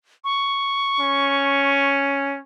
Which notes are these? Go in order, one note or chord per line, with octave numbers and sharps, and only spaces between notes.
C#6
C#4